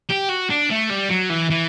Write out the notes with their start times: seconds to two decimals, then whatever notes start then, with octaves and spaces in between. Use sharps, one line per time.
0.10 G4
0.29 F#4
0.50 D4
0.70 A3
0.89 G3
1.09 F#3
1.29 E3
1.50 E3